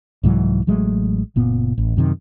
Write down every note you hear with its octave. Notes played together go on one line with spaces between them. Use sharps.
C2 G#2 E3 F#3
A1 F#3 G#3 A3
F#1 A#2 B3
A1
F#2 C3 D#3